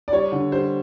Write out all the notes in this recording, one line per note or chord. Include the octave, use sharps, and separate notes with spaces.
D5
G3 C#5
D3
G3 C5